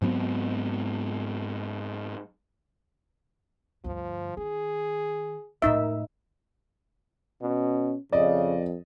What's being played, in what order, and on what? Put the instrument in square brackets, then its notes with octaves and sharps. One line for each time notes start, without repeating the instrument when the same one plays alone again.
[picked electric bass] G#2 F#3 B3 C4
[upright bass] D2 G2 [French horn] F3
[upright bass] D#3 [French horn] G#4
[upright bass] F2 A2 [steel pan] D#4 E5 [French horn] A#4
[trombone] B2 [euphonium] C#4
[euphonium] F2 [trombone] C#3 [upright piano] D5 D#5